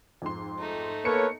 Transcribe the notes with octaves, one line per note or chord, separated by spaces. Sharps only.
F2 G#2 C6
A3 D#4
A#3 B3 A4 B4 C#5 C#7